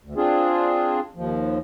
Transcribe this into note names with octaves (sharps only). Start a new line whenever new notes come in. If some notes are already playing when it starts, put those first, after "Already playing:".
D2
C4 D4 F4 G#4
D#2 F3